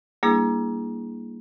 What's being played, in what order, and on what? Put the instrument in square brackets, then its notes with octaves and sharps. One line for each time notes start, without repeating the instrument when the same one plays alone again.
[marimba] G3 A#3 D4 E4 G#4